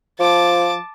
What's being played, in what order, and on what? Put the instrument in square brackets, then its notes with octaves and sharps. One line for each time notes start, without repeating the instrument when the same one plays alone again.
[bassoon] F3 [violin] A5 D6